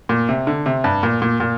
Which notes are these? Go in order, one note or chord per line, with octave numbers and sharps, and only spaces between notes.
A#2
C3
D3
C3
G2
A#2
A#2
A#2